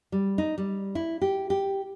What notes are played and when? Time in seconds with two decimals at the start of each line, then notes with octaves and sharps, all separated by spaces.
0.12 G3
0.38 D#4
0.58 G3
0.95 E4
1.22 G4
1.50 G4